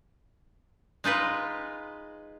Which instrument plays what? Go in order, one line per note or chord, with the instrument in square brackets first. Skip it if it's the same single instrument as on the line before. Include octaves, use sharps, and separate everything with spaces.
[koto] G#3 D#4 F4 B4